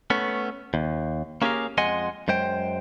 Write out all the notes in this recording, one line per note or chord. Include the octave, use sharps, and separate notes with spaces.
A3 B3 C#4
D#2
A#3 C#4 G4 G#4 A#4 F5
F2 G#3 D#5 F#5 G#5 C6
F#2 G#3 C5 G5